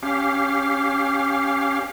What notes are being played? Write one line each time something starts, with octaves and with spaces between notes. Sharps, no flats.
C#4 G4 F5